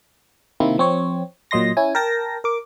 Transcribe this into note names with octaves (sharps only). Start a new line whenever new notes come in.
C3 D#3 A#3 C4 E4
F3 C4 C#5
A#2 F#3 D#5 C6 A#6
C#4 E4 G#5
A#4 G5 A5 A#6
A#4 D6